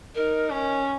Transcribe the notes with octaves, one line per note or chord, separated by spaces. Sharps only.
D#4 A#4
C#4